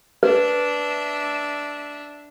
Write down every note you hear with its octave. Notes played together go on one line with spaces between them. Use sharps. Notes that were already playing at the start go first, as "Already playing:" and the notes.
D4 B4 E5